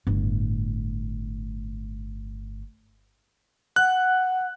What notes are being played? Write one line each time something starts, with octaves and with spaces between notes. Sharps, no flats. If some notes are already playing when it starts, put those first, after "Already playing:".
G1 A2
F#5 F#6